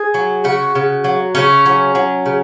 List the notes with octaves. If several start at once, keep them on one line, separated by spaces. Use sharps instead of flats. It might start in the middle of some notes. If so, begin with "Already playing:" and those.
Already playing: G#4
F#3
C#3 F#4
C#3
F#3
C#3 C#4
F#3
F#3
C#3